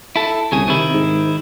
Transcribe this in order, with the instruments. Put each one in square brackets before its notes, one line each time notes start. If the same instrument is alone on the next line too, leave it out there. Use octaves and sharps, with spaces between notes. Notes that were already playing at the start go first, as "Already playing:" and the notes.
[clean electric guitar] E4 A4
[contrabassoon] C2 [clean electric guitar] C#3 G#4
[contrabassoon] C3 [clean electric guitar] D#3 E4
[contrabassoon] G#2